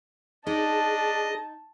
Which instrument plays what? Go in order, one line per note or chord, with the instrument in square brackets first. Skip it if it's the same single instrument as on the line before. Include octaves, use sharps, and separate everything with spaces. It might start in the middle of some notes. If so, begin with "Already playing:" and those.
[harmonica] D4 D#5 [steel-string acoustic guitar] D#4 [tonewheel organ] G#4 [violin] A5